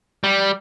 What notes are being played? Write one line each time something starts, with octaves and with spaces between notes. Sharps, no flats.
G3